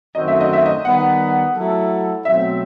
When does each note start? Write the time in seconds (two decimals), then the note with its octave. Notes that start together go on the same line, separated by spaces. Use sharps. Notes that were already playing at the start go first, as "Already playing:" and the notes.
0.15 F#2 D#3 A3 C4 F#4 D#5
0.28 E5
0.40 D#5
0.53 E5
0.66 D#5
0.85 D#3 G3 B3 F#5
1.55 F#3 A3 E4 A4
2.25 B2 F#3 A3 C4 E5